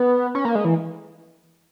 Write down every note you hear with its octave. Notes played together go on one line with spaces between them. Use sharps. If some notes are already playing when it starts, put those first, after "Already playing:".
Already playing: B3
C#4
A#3
G#3
E3